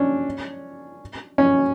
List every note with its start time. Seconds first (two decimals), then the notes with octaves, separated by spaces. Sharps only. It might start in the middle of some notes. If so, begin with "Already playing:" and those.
Already playing: C#4 D4
1.38 C#4